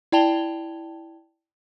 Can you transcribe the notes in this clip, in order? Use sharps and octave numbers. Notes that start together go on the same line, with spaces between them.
E4 D5 G5 A5 F7 G7